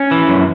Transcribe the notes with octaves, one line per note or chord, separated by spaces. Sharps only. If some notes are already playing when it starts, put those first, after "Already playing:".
Already playing: C#4
E3
F#2